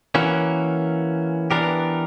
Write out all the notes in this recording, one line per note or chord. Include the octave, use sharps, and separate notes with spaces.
E3 A#3 C#4 F#4 A#4
E3 B3 D4 G4 A#4